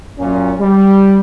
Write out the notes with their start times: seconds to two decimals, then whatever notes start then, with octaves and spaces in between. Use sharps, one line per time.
0.19 F#2 A#2 C#4
0.60 G3